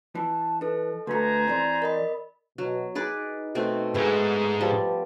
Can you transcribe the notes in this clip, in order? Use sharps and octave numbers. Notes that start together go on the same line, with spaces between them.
E3 A5
D#4 A4 B4
D2 A3 B4 C5 G#5 A#5
E3 C4 D5
A#4 D#5 B5
B2 F#3
D#4 G#4 B4 D5
B2 A3 C4
G#2 G#3 A3 B3 G#4
F3 G3 B3 A5